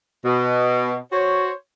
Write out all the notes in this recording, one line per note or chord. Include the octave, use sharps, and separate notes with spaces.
B2
F#4 C5 C#5